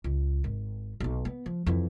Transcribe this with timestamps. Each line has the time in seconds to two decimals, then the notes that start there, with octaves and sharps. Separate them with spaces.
0.04 C#2
0.44 G#1
1.00 B1 D#4
1.25 B3
1.46 F3
1.66 F2 E3